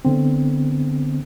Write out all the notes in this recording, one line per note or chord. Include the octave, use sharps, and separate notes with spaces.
D3 B3 C4